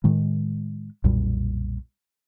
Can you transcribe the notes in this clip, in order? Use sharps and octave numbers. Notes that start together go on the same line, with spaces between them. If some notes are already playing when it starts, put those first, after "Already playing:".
A2 D#3 G#3
B1 F2 A#2 G3